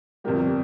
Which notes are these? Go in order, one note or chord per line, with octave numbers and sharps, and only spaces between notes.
G1 F2 C3 G3 G4 A#4